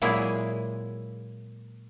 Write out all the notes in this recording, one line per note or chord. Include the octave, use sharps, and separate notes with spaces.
A#2 F#3 G#3 A#3 E4 G#4